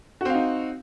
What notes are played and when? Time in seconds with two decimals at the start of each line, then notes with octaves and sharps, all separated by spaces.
0.21 F#4
0.25 C4
0.30 F5
0.34 D#4